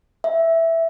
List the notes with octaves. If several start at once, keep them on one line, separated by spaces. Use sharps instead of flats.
E5